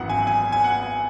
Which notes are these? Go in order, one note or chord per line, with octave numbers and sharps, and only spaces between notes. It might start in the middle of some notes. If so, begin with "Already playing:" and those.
Already playing: G#1 F#2 E3 B3 F#5
G#5
G#5
G#5
F#5